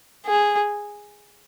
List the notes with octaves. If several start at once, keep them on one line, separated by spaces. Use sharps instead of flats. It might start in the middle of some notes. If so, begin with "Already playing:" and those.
G#4